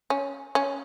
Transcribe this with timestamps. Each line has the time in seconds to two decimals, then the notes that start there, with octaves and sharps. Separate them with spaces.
0.10 C#4
0.55 C#4